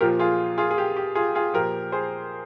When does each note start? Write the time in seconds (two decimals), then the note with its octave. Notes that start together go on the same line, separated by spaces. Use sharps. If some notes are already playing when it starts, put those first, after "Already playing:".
0.01 A#2 F3 G4 A#4
0.19 F4 G#4
0.58 F4 G#4
0.71 G#4
0.78 G4
0.97 G4
1.15 F4 G#4
1.35 F4 G#4
1.54 A#2 F3 G4 A#4
1.92 G#4 C5